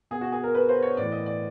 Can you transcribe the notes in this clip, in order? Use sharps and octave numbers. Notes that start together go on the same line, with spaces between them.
B2 G#4
F#4
G#4
A#4
B4
C5
C#5
A2 E3 D5
D#5
D5